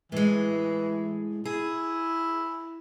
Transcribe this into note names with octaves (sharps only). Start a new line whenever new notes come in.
A2 E3 G#3
E4 G#4